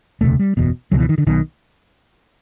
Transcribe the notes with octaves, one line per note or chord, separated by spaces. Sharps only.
E1 D2 C3 A3
G3
F#1 E2 B2
C#2 B2 F#3
E3
D#3
D3
B1 B2 D#3